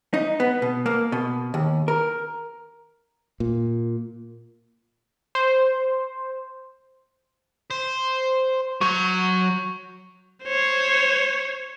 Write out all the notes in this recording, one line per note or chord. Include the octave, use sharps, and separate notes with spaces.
D#4
B3
B2
A#3
B2
D#2
A#4
A#2
C5
C5
F#3 C#5 C#6 G6 F7
C5 C#5